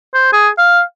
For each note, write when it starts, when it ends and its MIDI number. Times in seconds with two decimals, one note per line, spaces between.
0.14 0.32 72
0.33 0.49 68
0.58 0.82 77